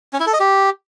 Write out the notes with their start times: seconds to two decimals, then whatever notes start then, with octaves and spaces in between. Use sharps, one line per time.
0.13 C#4
0.20 E4
0.27 A4
0.33 D#5
0.40 G4